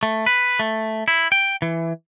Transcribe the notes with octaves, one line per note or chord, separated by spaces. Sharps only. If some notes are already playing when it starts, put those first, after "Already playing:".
A3
B4
A3
E4
G5
E3